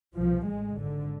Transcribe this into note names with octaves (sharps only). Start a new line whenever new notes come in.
C2 B2 F3
A1 A2 G#3
G#1 G#2 D3